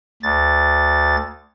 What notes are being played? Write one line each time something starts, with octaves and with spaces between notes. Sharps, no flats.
D2 A6